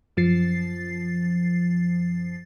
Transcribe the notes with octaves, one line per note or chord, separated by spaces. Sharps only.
F#2 F3 A6 C7